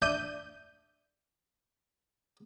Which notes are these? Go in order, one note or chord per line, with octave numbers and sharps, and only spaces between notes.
D4 D5 E5 G6 D#7